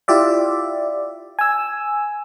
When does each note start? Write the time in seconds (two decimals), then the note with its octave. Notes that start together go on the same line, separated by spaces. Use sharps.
0.08 E4 F4 G4 D5 E5
1.39 G#5 E6